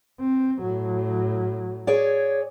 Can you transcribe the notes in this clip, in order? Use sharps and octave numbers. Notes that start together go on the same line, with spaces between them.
C4
A2 F#3
G#4 C#5 D5